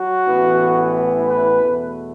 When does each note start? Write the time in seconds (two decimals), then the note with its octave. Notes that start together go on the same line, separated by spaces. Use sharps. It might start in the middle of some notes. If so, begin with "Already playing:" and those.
Already playing: F#3 F#4
0.26 A1 A2 E3 B3
1.27 B4
1.60 E2 B2 A3